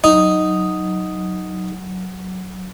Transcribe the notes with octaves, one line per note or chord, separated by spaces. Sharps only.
F#3 D#4